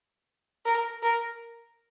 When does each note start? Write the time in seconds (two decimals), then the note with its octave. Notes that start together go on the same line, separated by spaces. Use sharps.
0.65 A#4
1.03 A#4